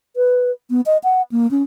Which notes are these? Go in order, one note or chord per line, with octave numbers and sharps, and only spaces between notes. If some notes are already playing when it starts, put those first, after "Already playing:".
B4
B3
D#5
F#5
A#3
C#4